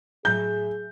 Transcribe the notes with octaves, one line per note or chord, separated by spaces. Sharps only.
A2 F#3 G#4 E5 G6